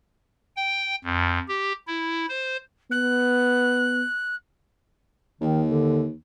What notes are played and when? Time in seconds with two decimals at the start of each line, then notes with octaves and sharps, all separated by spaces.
0.56 G5
1.04 F2
1.48 G4
1.87 E4
2.29 C5
2.91 B3 F#6
5.41 D#2 D#3
5.67 D3